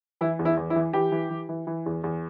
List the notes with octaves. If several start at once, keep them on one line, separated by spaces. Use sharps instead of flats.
E3 E4
E2
E4
E2
E4
E3
E3 G4
E3
E3
E3
E3
E2
E2